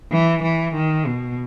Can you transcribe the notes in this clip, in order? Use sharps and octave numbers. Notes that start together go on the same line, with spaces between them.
E3
E3
D#3
B2